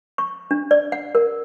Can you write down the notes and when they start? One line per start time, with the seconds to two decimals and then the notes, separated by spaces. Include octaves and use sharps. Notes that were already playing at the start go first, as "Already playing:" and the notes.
0.18 C#6
0.51 D4
0.71 D5
0.92 F#5
1.15 A#4